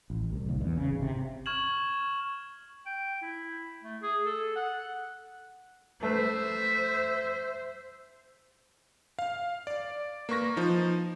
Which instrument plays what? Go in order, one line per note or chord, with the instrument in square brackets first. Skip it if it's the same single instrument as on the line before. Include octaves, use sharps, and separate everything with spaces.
[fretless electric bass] A1
C2
D#2
E2
C#3
G#1
C3
[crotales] C#6 F6 G#6 E7 F#7
[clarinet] G5
E4
A3
G#4
A4
F#5
[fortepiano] A3 B4 [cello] C5 [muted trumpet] E5
[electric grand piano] F5
D5
A#3 B4 C#6 A#6
F3 D#4